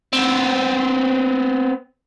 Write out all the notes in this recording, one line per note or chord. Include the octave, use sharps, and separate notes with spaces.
B3 C4